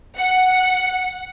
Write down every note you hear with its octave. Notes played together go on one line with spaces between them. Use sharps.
F#5